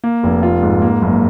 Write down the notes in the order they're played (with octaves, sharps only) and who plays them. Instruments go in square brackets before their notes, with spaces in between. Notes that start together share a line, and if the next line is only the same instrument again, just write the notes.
[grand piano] A#3
F1
F4
G#2
A#3
F#1